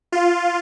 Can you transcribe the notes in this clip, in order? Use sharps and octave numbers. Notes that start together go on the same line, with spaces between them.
F4